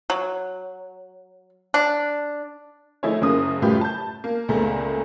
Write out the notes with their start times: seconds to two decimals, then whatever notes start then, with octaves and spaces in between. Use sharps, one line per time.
0.10 F#3
1.74 D4
3.03 F3 A3 D#4 E4 G#4 C#5
3.21 F#1 F#2 C#3 A#3 D#6
3.62 F#2 A2 G3 F4 G4 B4
3.81 A5 G6
4.24 A#3
4.49 C#2 A#2 C#3 A3 B3 A#5